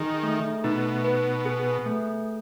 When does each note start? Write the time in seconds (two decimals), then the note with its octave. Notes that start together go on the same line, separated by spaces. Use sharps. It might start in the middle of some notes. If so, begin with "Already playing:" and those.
Already playing: D#3 G#4
0.23 A3
0.64 B2 D#4
1.04 B4
1.46 G#4
1.86 A3